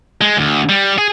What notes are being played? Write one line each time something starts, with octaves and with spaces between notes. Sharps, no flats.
G#3
D2
G3
G#4